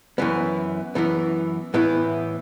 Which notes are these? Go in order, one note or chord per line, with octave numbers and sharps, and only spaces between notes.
F#2 E3 B3
F#2 E3 B3
A2 E3 B3 E4